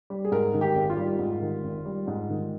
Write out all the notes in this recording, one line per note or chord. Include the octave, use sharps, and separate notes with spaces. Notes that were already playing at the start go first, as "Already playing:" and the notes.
G3
G#4
G#2 A#4
D#3
G4
G#1
F4
G3
G#2
D#3
G#1
G3
G#2
D#3